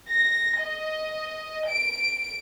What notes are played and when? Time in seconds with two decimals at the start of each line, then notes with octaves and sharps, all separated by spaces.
0.10 A#6
0.62 D#5
1.69 D7